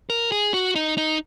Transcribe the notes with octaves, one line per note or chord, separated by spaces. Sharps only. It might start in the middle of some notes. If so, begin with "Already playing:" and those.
A#4
G#4
F#4
D#4
D#4